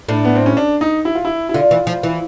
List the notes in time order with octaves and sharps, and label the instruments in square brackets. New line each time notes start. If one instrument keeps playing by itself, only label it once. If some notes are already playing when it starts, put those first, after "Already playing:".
[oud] A2 [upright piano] D4
[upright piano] B3
C4
C#4
D4
D#4
E4
F4
E4
E4
[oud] D3 [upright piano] F4
[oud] E3
F3
E3